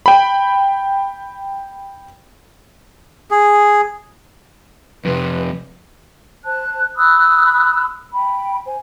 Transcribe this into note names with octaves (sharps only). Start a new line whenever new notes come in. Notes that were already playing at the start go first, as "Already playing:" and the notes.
G5 B5
G#4
F2 C3 B4
C5 A5 F#6
B5 D#6 E6 F#6
G5 B5
C5 G#5